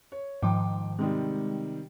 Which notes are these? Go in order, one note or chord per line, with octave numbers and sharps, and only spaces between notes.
C#5
G#2 D#3 F3 G5 D6
C3 D#3 G3 G#3